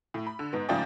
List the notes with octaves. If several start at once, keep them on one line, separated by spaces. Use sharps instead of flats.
A2
B5
D3
G#2 B3
G#2 C#3 F3 A3 D5 G5